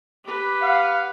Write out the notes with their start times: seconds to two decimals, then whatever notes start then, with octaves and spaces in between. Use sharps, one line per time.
0.25 G4 B4
0.61 F5 F#5